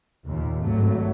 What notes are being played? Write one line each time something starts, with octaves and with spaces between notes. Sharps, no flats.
D#2 A#2
G#1 G2 F#3 A3